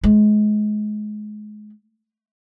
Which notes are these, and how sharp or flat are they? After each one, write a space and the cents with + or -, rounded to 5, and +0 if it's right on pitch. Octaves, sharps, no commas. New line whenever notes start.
G#3 +30